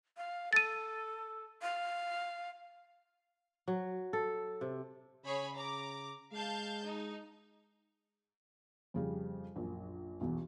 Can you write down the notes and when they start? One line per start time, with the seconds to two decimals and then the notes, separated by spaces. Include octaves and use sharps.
0.17 F5
0.53 A4 A6 D#7
1.62 F5
3.68 F#3
4.13 A4
4.61 C3
5.25 C#3 G#4 C#5 B5
5.56 A#5 D6
6.33 G#3 F5 A5 G6
6.86 D#4
8.94 F2 C#3 G3
9.56 A#1 F#2
10.21 B1 E2